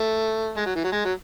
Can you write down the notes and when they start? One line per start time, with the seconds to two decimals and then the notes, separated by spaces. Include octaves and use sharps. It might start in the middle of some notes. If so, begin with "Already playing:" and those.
Already playing: A3
0.57 G#3
0.66 F#3
0.75 E3
0.84 F#3
0.92 G#3
1.05 F#3